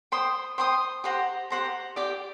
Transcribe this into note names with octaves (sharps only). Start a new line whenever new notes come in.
C5 G5 C6 D#6
C5 G5 C6 D#6
G4 C5 F#5 A#5
G4 C5 F#5 A#5
G4 D5 G5 D6